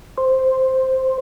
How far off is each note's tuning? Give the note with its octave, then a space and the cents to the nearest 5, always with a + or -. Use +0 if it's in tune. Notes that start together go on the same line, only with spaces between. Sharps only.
C5 +0